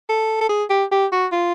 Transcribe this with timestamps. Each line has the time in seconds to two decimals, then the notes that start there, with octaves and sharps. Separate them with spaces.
0.09 A4
0.41 A4
0.49 G#4
0.70 G4
0.92 G4
1.12 F#4
1.32 F4